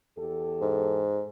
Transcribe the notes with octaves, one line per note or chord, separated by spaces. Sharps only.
E2 G4 A4
G#2